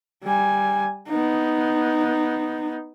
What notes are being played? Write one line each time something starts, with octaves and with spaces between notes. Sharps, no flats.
G3 G#5
B3 D#4